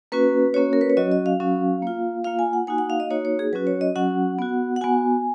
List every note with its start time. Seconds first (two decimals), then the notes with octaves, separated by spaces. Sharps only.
0.12 A#3 C#4 F#4 B4
0.54 A#3 C#4 F#4 C#5
0.73 A#4
0.81 B4
0.90 C#5
0.97 F#3 C#4 F#4 D#5
1.12 D#5
1.26 F5
1.40 F#3 C#4 F#4
1.83 A#3 F4
2.24 A#3 F4 F5
2.39 G#5
2.53 F#5
2.67 A#3 D#4 F#4 G#5
2.78 F#5
2.90 F5
3.00 D#5
3.11 A#3 D#4 F#4 C#5
3.25 C#5
3.39 G#4
3.53 F#3 C#4 F#4 B4
3.67 C#5
3.81 D#5
3.95 F#3 C#4 F#4 F#5
4.39 B3 F#4
4.76 F#5
4.81 B3 F#4 G#5